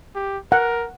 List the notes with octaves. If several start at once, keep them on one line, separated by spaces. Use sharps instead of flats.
G4
A#4 F#5